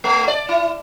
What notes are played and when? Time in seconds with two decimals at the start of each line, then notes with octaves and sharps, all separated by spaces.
0.04 A3
0.28 D5
0.49 E4